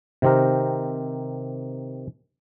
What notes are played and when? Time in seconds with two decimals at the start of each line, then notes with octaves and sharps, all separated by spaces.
0.22 C3 D#3 C4 G4 A#4